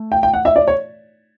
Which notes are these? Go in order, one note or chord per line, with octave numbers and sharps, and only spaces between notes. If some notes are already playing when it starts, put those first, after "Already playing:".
Already playing: A3
G5
G5
F#5
E5
D5
C#5